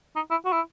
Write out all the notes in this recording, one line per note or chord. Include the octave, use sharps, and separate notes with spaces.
D#4
E4
F#4
E4